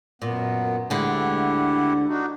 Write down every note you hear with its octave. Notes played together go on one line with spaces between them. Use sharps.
F#2 A#2 B3
D2 D3 G#3 E4 G4 F#5
D4 D#4 F#4